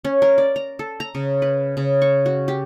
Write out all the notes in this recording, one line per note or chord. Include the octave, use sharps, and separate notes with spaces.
C#4
A#4
D5
A#5
A4
A#5
C#3
B4
C#3
C#6
F#4
G4